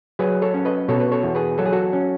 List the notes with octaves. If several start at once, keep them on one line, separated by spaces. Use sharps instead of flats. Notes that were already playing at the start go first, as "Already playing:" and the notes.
F#3 G#4 B4
A4 C#5
C#4
B4 D#5
B2 A4 C#5
B4
A4 C#5
E2
G#4 B4
F#3 A4
G#4
F#4 A4
C#4